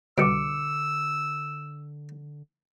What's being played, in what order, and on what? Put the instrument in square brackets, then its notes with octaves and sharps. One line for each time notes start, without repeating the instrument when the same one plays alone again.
[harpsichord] C2 B2 [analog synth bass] D3 [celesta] D6 C#7 D7 [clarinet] E6